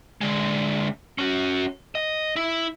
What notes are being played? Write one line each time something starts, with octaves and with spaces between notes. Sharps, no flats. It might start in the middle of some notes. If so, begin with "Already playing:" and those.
D3 G#3
C#4 F#4
D#5
E4